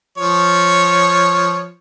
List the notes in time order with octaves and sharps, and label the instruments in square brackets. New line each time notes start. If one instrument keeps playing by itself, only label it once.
[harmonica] F3 C#5